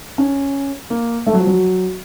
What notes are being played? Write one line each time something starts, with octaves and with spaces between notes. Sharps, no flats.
C#4
A#3
A3
F#3
F3
F#3